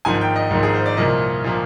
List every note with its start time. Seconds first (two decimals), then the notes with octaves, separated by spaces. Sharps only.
0.05 G#1 G#2 F3 A#3 G#5
0.21 G5
0.36 D#5
0.51 G#1 G#2 F3 A#3
0.63 G#4
0.74 C5
0.86 D5
0.97 C2 A#2 F3 A#3 D#5
1.44 A#2 F3 A#3